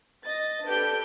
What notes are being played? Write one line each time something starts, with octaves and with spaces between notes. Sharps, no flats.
D#5 A6
D4 G4 A4 B4 G6 D7